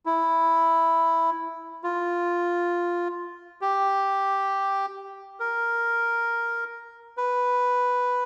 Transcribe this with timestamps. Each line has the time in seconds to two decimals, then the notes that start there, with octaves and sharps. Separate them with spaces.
0.06 E4
1.83 F4
3.61 G4
5.40 A#4
7.17 B4